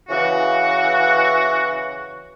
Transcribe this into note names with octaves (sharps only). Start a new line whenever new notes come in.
C#3 E3 F#4